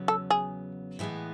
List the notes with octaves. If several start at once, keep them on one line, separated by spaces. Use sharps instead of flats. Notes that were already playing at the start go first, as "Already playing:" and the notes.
Already playing: E2 C#3 F#3 B3
A4
G#4
A2 E3 G#3 B3